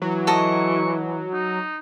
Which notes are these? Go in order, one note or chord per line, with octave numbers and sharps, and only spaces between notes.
E3 F#3
A4 A#4 D#5 C#6
D#4